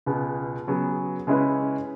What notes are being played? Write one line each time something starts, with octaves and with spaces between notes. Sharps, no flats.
C#2 B2 B3 G#4
C#3 F#3 B3 G#4
C#3 G#3 C#4 E4 B4